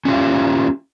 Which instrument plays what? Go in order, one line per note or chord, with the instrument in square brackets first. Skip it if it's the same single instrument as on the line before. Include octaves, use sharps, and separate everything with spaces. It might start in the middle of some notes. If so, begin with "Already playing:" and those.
[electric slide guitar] C#4 D4 E4 F4 G4 F5